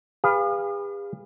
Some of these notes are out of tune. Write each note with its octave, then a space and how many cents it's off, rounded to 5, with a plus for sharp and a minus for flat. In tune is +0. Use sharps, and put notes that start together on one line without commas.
G#4 -45 B4 +0 F5 +0